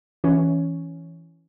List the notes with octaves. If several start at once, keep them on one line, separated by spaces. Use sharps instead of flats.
E3 C#4